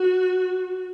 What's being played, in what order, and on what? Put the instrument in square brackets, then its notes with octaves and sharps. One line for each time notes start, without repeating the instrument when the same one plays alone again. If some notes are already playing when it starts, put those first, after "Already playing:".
Already playing: [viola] F#4